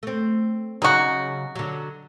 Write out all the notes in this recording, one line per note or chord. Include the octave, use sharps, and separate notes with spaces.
A3 C4
C#3 F#3 D#4 F#4
D3 F#3